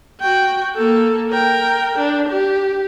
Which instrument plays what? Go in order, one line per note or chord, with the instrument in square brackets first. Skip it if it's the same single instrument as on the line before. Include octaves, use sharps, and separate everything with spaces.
[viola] F#4 G5
A#3 A4
A#4 G5
D4
G4